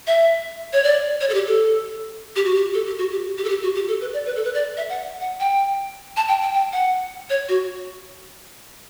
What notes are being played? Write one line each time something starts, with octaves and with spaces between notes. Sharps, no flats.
E5
C#5
D5
C#5
A4
G4
A4
G4
F#4
G4
A4
G4
F#4
G4
G4
A4
G4
F#4
G4
A4
B4
D5
B4
A4
B4
D5
E5
F#5
F#5
G5
A5
G5
G5
G5
F#5
C#5
F#4